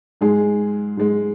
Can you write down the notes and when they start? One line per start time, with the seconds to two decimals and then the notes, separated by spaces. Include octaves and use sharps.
0.21 G#2 G#3 G#4
0.97 G#2 G#3